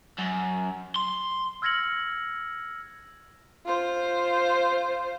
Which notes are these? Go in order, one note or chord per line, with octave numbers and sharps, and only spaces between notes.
F#2
C6
E6 F6 G#6 A#6 C#7 F#7
F4 C5